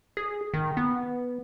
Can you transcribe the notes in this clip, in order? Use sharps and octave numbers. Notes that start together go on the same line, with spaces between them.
G#4
D#3
B3